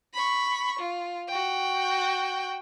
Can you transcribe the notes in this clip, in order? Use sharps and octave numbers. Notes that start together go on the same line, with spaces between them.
B5 C#6
F4
F#4 G5